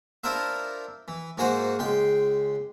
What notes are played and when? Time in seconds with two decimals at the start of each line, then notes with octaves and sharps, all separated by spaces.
0.24 D4 E4 F4 A#4 C5 E5
1.08 E3
1.38 G#2 A#3 F#4 G#4 C5 F#5
1.79 C#2 G#3 G5 C6